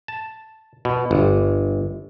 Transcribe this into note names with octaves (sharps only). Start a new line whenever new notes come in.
A5
B2
G1